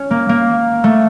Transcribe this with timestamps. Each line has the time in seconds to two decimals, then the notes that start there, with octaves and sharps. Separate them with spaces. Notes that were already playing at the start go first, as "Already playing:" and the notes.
Already playing: C#4
0.11 A#3
0.29 A#3
0.84 A3